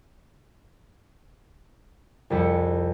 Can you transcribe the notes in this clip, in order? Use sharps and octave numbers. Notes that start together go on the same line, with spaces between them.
C2 F2 E4 G#4 C#7